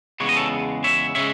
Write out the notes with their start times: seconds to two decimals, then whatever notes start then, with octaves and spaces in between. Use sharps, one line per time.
0.20 E2 C#3 G#3 B3 C#5
0.29 D#5
0.36 A4 C#5
0.84 C#5 E5
1.15 C#3 G#3 C#5 E5